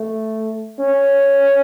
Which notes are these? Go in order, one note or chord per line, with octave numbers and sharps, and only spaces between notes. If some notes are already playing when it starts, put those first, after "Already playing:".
Already playing: A3
C#4